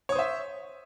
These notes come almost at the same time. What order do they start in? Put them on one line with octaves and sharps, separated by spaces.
C#5 D#6 C5 E5